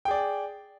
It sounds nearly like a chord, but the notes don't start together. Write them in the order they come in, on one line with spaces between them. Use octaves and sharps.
G5 G#4 D5